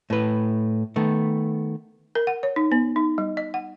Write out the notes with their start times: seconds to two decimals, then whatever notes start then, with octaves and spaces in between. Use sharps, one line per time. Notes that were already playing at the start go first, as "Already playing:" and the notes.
0.10 A2 B4
0.96 D#3 A3 B3
2.15 A#4
2.27 F#5
2.43 C#5
2.56 D#4
2.72 B3
2.96 D#4
3.18 G3
3.37 D#5
3.54 F#5